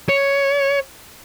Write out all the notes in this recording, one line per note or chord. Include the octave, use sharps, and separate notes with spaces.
C#5